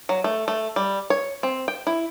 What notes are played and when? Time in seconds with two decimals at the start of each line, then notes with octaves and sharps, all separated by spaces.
0.09 F#3
0.24 A3
0.48 A3
0.76 G3
1.10 C#5
1.43 C4
1.68 G5
1.87 E4